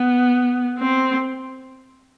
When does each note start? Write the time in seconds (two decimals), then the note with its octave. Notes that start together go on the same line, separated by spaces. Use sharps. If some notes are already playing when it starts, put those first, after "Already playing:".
Already playing: B3
0.78 C4